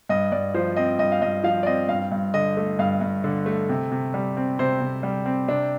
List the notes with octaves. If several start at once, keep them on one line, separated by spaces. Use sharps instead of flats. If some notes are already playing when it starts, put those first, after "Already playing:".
G2 D#5
G2 D5
F3 C5
C4 D#5
G2 D#5
F5
G2 D#5
F3 F5
D5
C4 D#5
G2 F5
G2
D3 D#5
A3
G2 F5
G2
D3
A3
C3
C3
G3
C4
C3 C5
C3
G3
C4
C3 D4